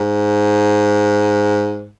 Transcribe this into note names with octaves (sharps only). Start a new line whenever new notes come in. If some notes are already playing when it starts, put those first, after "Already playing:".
Already playing: G#2